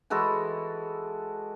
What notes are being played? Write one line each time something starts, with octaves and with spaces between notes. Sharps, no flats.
E3 G#3 F#4 A4